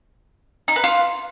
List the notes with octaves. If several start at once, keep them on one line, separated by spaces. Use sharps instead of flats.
D#4
B4
F4